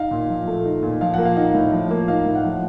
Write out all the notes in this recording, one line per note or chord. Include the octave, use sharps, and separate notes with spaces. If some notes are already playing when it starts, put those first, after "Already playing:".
Already playing: D#4 F5
A#2
F3
A3
D#4
A#2
F3 F5
A#3 F#5
F5
D#4
A2
F3
A#3
D#4 F5
A2
F#5
F3